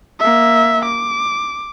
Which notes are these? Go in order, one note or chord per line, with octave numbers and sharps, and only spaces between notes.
A#3 E5
D6